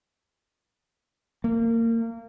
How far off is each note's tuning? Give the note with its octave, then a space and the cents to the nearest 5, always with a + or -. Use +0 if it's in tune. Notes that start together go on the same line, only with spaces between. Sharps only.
A#3 -25